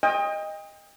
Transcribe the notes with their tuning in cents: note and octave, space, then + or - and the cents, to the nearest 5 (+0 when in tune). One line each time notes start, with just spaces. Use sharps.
D#5 +0 G5 +35